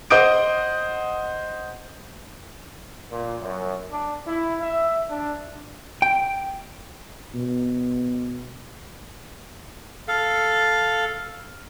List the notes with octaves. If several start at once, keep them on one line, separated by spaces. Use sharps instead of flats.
C5 D#5 F#5 D#6 G6 D7
A#2
F#2
D4
E4
E5
D4
G5
B2
A4 F5